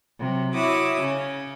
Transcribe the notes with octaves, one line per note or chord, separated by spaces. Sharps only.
C3 F#3
E4 F#4 C#5 E5 D6 D#6
C#3 C#4